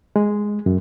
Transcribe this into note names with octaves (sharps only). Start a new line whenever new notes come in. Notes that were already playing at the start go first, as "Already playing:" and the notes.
G#3
F#2